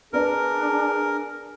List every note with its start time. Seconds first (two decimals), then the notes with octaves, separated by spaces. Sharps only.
0.13 B3 D4 G#4 A#4 D5 A#5